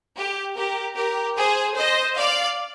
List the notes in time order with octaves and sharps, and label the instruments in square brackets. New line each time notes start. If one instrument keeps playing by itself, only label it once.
[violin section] G4
G4 A#4
G4 A#4
G#4 C5
C5 D#5
D5 F5